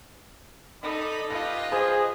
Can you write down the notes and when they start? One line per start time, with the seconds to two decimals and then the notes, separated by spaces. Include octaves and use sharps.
0.83 D#4 A4 D5 D#5 B5
1.31 F4 G4 B4 D#5 F5 A#6
1.72 G#4 C5